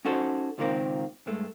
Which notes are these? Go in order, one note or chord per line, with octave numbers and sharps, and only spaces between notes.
C#4 D#4 F#4 A4 C5
C#2 A#2 D#3 G3 A#3 C4
G2 G#3 A3